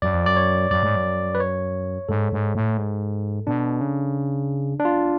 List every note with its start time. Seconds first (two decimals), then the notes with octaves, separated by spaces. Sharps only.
0.02 F#2 D5
0.14 F2
0.26 F#2 D5
0.36 C#5
0.71 F#2 D5
0.83 G#2
0.96 F#2
1.35 B4
1.40 C#5
2.09 G#2 A4
2.32 G#2
2.55 A2
2.77 G#2
3.47 B2 D4
3.81 C#3
4.80 D4
4.85 F4